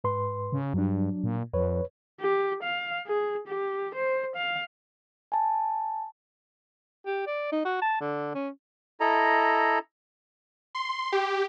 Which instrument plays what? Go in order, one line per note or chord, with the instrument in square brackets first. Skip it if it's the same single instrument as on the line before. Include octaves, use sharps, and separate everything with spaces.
[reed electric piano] G#2 B4 C6
[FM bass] C#3
[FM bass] G2 [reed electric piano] F#3 D4
[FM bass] A#2
[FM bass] F2 [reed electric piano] B4 C#5
[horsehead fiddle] G4
F5
G#4
G4
C5
F5
[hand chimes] G#5 A5
[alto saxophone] G4
D5
D#4
F#4
A5
D3
C#4
[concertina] E4 A4 D#5 A#5
[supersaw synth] C6
G4